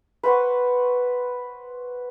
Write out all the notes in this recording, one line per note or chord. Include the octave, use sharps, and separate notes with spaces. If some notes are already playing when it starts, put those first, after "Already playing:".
B4 C5 F#5 C#6